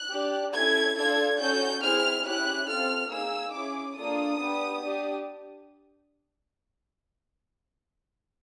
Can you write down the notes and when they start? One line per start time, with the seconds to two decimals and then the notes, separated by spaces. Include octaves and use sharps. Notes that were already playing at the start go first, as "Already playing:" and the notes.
Already playing: F#6
0.12 D4 G4
0.54 C#4 E4 A4 G#6
0.97 D4 F4 A4 G#6
1.40 C#4 F#4 A4 G6
1.82 C4 E4 G#4 F6
2.25 C#4 E4 G4 F#6
2.68 C4 F4 A4 F6
3.11 A#3 D#4 G#4 E6
3.53 C#4 E4 G#4 D6
3.95 A#3 D4 F4 A4 D#6
4.39 B3 D4 G4
4.81 D4 G4